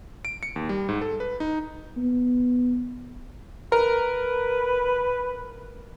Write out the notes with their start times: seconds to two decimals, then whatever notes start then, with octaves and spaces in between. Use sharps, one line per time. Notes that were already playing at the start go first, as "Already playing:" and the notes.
0.25 D7
0.43 C#7
0.56 D#2
0.69 G3
0.89 G#2
1.02 A4
1.20 B4
1.40 D#4
1.97 B3
3.72 A#4 B4